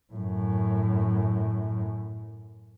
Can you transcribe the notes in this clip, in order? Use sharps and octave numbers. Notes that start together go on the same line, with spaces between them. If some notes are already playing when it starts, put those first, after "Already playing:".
F#2 A2